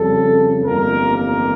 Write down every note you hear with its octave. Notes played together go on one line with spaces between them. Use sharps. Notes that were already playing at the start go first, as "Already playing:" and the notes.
Already playing: F2 C#3 G3 A4
G1 F2 E3 G3 A#3 A#4
A#4